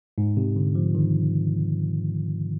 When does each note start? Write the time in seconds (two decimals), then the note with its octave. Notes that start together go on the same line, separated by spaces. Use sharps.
0.18 G#2
0.37 C3
0.56 D3
0.75 F3
0.95 D#3